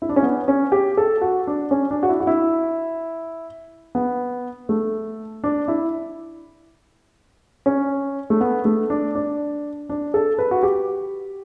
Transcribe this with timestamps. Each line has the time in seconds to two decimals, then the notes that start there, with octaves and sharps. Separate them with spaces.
0.02 E4
0.09 D4
0.16 C#4
0.23 B3
0.48 C#4
0.72 G4
0.97 A4
1.21 F#4
1.47 D4
1.71 C#4
1.91 D4
2.03 F#4
2.09 E4
2.20 F#4
2.27 E4
3.95 B3
4.69 A3
5.44 D4
5.68 E4
7.66 C#4
8.30 A3
8.41 B3
8.65 A3
8.90 D4
9.15 D4
9.89 D4
10.14 A4
10.38 B4
10.51 F#4
10.63 G4